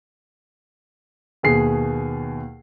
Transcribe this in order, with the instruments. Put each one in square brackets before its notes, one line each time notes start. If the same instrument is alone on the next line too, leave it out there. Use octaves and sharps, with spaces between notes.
[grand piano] D#2 B2 G#4 C7